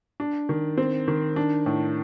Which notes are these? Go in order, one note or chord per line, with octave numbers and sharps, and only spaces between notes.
D4
D#3
C4
D#3
D4
A2